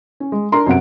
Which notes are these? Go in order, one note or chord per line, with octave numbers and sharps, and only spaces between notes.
C#4
G#3
D4 A#4 A#5 C6
F#2 C3 F#5 D7